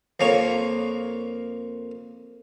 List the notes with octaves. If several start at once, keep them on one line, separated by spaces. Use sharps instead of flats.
F2 A#3 C#5 C#6